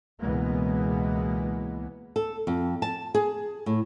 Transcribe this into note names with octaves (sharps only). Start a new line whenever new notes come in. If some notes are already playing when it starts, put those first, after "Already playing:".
C#2 B2 E3 G#3 A#3 B3
A4
F2
A5
G#4
A2